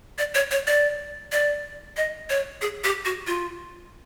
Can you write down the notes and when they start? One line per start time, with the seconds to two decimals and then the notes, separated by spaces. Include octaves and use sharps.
0.18 D5
0.35 C#5
0.51 C#5
0.67 D5
1.32 D5
1.97 D#5
2.30 C#5
2.62 G#4
2.84 G4
3.05 F#4
3.27 F4